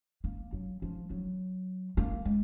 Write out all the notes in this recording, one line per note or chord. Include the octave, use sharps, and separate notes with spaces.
A#3
F#3
F3
F#3
A#3
G#3